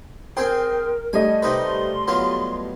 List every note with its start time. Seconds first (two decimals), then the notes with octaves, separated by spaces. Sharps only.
0.37 C4 G#4 A#4 C5 G5
1.13 G3 A3 D#5 G#5
1.42 C3 D#4 B4 C6
2.08 F#3 B3 F4